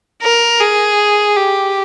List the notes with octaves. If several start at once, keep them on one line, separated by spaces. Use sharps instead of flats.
A#4
G#4
G4